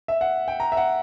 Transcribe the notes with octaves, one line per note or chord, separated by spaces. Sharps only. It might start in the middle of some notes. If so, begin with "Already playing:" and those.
E5
F#5
G5
A#5
E5
F#5